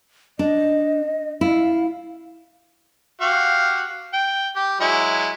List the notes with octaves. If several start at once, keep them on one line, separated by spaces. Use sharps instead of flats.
D4 D#5
E4 F5
F#4 G4 F5
G5
G4
F#3 G#3 E4